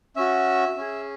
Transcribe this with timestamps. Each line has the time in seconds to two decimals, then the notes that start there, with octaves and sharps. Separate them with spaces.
0.16 C#4 F#4 E5
0.76 C#4 G#4